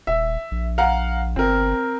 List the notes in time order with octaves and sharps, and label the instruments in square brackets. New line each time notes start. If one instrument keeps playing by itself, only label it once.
[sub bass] D#1 [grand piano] E5
[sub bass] A#1
[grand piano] F5 F#5 A#5
[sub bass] G1 [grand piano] C4 A#4